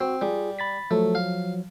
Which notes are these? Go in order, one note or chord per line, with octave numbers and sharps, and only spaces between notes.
C4 F#4
G3 F4 G#4
B5 A6 B6
F3 F#3 A3
F5